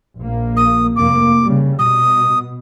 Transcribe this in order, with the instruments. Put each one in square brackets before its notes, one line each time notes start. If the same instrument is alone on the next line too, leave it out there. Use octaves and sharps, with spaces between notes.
[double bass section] A#1 A#3
[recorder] D#6
[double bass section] F1 A#3 [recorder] D6
[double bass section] C#3 G3
[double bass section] B2 [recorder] D#6